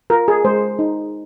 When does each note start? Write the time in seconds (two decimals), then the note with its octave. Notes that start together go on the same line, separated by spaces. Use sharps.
0.10 F4 A#4
0.28 G#4
0.45 G#3 C5
0.79 D#4